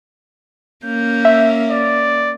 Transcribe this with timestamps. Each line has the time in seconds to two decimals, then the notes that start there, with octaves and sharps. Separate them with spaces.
0.85 A#3 C#4 G6
1.25 E5
1.71 D5